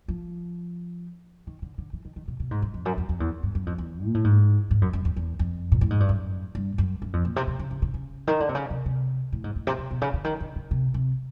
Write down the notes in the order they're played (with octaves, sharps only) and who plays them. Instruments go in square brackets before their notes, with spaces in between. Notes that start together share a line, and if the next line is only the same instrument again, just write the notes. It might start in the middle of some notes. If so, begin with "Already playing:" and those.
[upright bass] F3
D#3
D3
D3
E3
D#3
D#3
B2
B2
G#2
F#2
F2
F#2
F2
F2
E2
G2
F#2
F2
E2
A#2
A2
G#2
G#2
F#2
F#2
E2
E2
F2
A#2
A2
G#2
G2
F#2
G2
F#2
F#2
F2
A#2
C3
C3
C#3
C#3
C#3
C#3
D#3
D3
C3
C#3
C3
C3
A2
G#2
A2
C3
C3
B2
C#3
D3
D#3
D3
C#3
C3
C3